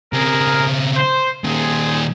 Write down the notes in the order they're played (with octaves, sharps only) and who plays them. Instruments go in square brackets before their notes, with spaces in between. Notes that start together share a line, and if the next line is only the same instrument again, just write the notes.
[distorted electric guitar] C#3 C4 [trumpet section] G#4 A#4
[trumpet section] C5
[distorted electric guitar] A#2 D#3 [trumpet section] C4 G#4